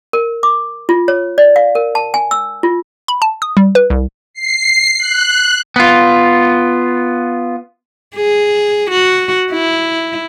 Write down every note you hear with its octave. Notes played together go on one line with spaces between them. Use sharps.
A#4
D6
F4
C#5
D5
F5
A#4
A5
G#5
E6
F4
B5
A5
D#6
G3
B4
C2
C7
F#6
B3 F4
G#4
F#4
E4